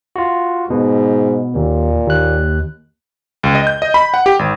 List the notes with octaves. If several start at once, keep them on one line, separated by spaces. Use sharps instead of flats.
F4 F#4
G#2 B2
D#2 A#2
D#2 F#6
C#2
D#5
G6
D#5
B5
F#5
G4
G#1